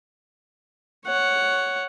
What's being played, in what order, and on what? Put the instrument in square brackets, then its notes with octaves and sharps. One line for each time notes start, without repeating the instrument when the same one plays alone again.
[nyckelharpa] C#5 F#5